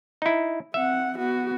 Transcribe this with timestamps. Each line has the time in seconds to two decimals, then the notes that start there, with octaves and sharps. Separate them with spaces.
0.22 D#4 E4
0.74 C4 E5 F#5
1.18 B3 F#4